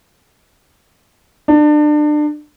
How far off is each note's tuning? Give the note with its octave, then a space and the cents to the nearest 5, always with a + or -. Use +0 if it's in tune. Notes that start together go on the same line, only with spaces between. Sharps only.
D4 +30